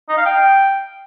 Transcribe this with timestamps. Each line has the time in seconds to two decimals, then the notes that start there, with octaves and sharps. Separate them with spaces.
0.09 D#4
0.17 F5
0.26 G5